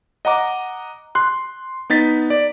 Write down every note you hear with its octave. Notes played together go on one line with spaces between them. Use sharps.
D#5 F#5 A#5 D6
C6 F#6
B3 D#4 A6 B6
D5